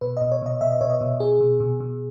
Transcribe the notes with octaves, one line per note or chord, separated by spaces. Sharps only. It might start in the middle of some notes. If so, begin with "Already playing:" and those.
B2 B4
B2 D#5
C#5
B2 D#5
B2 E5
D#5
B2 C#5
D#5
B2
B2 G#4
B2
B2
B2